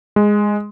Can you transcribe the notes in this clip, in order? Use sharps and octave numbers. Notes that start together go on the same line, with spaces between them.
G#3